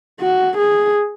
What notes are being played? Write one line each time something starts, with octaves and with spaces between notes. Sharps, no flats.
F#4
G#4